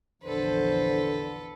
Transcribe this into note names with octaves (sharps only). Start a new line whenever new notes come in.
A#1 E2 D3 A4 B4 C5